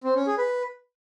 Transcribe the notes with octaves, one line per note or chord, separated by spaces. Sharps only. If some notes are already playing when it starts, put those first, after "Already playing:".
C4
C#4
G#4
B4